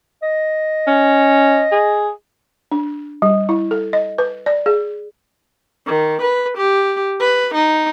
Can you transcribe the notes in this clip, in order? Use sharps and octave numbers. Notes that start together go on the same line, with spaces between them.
D#5
C#4
G#4
D4
G3
E4
A4
D#5
B4
D5
G#4
D#3
B4
G4
B4
D#4